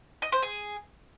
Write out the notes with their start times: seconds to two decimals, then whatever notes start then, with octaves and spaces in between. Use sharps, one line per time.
0.22 D#5
0.32 C5
0.43 G#4